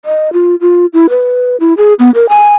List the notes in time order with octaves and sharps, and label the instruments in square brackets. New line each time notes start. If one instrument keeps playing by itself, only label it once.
[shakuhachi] D#5
F4
F4
E4
B4
E4
G#4
B3
A#4
G#5